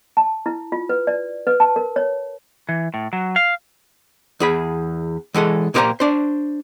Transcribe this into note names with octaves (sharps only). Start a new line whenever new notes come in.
A5
E4
F4
B4
D5
B4
A5
A#4
C#5
E3
A2
F#3
F5
E2 G#4 B5
E3 G#3 A4 F#5
A#2 A#3 D#4 G4 C5 A#5
D4 C5